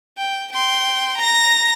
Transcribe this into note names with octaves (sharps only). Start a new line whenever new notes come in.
G5
G5 C6
A#5 A#6